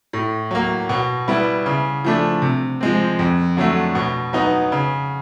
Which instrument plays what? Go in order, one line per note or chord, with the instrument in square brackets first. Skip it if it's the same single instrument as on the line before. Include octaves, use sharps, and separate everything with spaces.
[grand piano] A2
F#3 A#3
B2
G3 B3 E4
C#3
F3 A3 D4
C3
F3 G#3 C4
F2
D3 F#3 A3
B2
F#3 B3 D#4
C#3